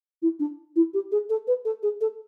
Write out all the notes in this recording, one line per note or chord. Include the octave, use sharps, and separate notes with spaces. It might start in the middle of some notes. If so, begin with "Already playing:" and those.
E4
D4
E4
G4
G#4
A4
B4
A4
G#4
A4